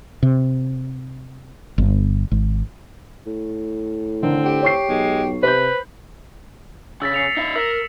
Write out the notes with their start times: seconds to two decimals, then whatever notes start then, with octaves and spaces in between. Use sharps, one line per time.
0.23 C3
1.78 G1
2.31 G#1
3.26 A2
4.23 D3 D#3 C4
4.45 G4
4.63 C#5 C#6 C7
4.89 B1 G#3
5.43 C3 B4 C5 G6
7.02 C#3 E6 A6 B6
7.14 C7 C#7 F7
7.37 D#4 E5
7.55 A#4 E6 B6 E7